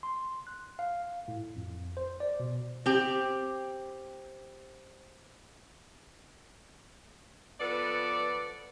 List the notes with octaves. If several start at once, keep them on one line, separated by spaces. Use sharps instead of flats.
C6
F#6
F5
A2
F2
C5
D5
B2
C4 G4
F3 B3 A4 B4 D5